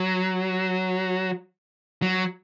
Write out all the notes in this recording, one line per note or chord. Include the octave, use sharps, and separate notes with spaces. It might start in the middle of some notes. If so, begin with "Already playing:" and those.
Already playing: F#3
F#3